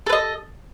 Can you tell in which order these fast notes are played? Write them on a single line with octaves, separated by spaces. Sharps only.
A4 B4 D#5